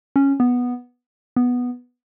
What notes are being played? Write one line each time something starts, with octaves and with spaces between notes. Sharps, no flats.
C#4
B3
B3